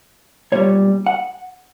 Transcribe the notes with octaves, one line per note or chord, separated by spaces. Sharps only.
B1 A#2 G3 C#5
F#5